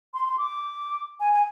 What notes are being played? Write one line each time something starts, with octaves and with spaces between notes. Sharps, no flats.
C6
C6
D6
G#5
G#5